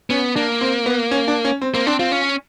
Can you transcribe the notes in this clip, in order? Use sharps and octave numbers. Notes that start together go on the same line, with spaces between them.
B3 C#4
A#3 D4
C4
B3
C#4
D4
C#4
C4
A#3 C4
C4 D4
C4 F4
C#4